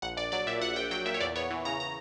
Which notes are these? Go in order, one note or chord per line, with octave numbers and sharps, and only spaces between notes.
A#1 F#5
A#1 D5
F#3 D5
A#2 E5
A#1 F#5
A#1 G5
F#3 G5
A#2 E5
C#5
E2 D5
B3 C#5
E3
C#3 A#5
A#5